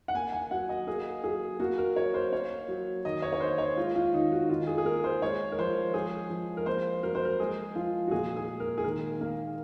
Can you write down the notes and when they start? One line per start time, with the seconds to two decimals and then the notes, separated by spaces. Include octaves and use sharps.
0.08 F#5
0.14 A#3 G#5
0.32 G#5
0.51 F#3 F#5
0.69 D#5
0.87 A#3 G#4
1.24 F#3 G#4
1.60 A#3 F#4
1.78 A#4
1.96 F#3 C#5
2.14 C5
2.32 A#3 C#5
2.68 F#3
3.05 D#3 D#5
3.22 C#5
3.33 C#5
3.40 A#3 C5
3.58 C#5
3.76 G#3 F4
3.96 F4
4.13 D#3 D#4
4.32 F#4
4.49 D#3 F4
4.67 G#4
4.78 G#4
4.85 A#3 A#4
5.04 C5
5.22 G#3 C#5
5.52 A#4
5.58 F3 C5
5.94 G#3 G#4
6.30 F3
6.57 A#4
6.66 A#3 C5
7.03 F#3 A#4
7.15 C5
7.25 A#4
7.39 G#3 G#4
7.75 F3 F4
8.07 F#4
8.11 A#2 G#4
8.36 G#4
8.47 G#3
8.60 A#4
8.78 G#4
8.84 D#3 A#4
9.21 A#3